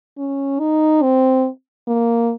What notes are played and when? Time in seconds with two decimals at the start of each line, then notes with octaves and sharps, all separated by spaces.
0.18 C#4
0.60 D#4
1.03 C4
1.88 A#3